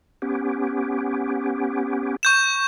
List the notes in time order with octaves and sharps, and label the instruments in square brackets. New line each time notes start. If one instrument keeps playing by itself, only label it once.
[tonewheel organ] B3 C#4 G4
[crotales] C#6 G6 E7